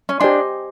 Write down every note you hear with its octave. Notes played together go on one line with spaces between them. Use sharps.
C#4
D4 G4 C5 D#5 G#5 C6